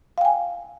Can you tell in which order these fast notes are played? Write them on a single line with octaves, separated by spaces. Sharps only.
F5 G5 G#5